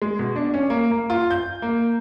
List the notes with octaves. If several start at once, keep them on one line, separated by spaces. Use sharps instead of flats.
G#3
B2
D4
C#4
A#3
A#3
F4
G6
A#3